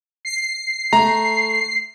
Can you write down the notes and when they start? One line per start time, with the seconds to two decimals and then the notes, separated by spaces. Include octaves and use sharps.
0.25 C7
0.93 A3 A#5